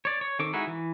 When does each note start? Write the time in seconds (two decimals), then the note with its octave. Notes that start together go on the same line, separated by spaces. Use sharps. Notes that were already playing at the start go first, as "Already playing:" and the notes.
0.05 C#5 D5
0.21 C#5
0.39 D#3 C4 A4 C#6 D6
0.53 G#3 D#4 E4 F#4 E5
0.67 E3